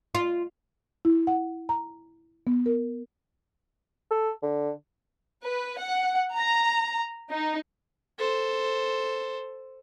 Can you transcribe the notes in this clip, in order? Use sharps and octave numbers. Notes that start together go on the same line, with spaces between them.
F4
E4
F#5
A#5
B3
A#4
A4
D3
B4
F#5
A#5
D#4
A4 C5